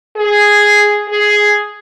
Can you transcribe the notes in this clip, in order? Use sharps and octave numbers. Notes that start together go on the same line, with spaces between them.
G#4
G#4